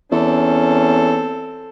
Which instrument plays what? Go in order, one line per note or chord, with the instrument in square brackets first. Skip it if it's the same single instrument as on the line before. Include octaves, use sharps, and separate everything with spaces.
[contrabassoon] E2 [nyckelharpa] C4 A4 [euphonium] C#4